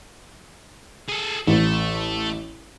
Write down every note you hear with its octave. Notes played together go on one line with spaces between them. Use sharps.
G#4 A4
A1 A3